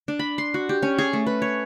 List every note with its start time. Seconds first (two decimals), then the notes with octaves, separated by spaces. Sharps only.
0.08 D4
0.19 B5
0.38 C6
0.54 F#4
0.69 G4
0.83 C#4
0.98 G#4
1.13 A3
1.26 B4
1.42 C#5